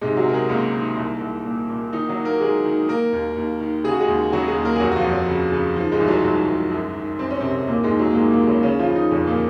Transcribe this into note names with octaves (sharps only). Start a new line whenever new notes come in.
G#2 C3 G#3
F#3 F#4
C3 A#4
G#3 G#4
C#2 A#3 A#4
D#3
C2
C2
A#2
A#2
D#3 D#4
F#3 F#4
D#3
A#3 A#4
D#3 G#3 G#4
D#3
D#3 A#3 A#4
D#2
D#2
D#3
C#3 G#4
F#4
G#3 G#4
D#2
C#3 F#3 F#4
G#3 G#4
D#2
A#3 A#4
G#4
F2 F#3 F#4
F#4
F3 F4
F2
F#3
C#3
C#3
D#3 F3
G#2 G#3
C2 F3
F#3
C2 G#2 G#3
C2
F#2
D#3
F#2 C4
C#4
F#2 C3 C4
D#2 A#2 A#3
G#2 G#3
D#2
F#3
A#3
G#2 D#3 G#3
A#2 A#3
D#2
C#3 C#4
C#3 C#4
F3 F4
C#3
D#3 D#4
F2 C#3 C#4
A#2 A#3
C#3